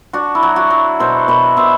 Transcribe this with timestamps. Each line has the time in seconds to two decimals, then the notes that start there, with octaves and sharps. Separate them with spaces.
0.13 D4 F#4
0.35 E4
0.43 F#3
0.56 F#4
0.70 F#3
1.00 B2 A4 C5
1.28 B2 B4 D5
1.57 B2 C5 E5